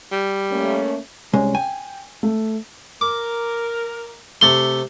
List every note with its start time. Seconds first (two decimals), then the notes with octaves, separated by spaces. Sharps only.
0.12 G3
0.51 A3 A#3 C#4
1.33 C2 G#3 C#4
1.55 G5 G#5
2.23 A3
3.01 A#4 D6
4.41 C3 A3 C6 G7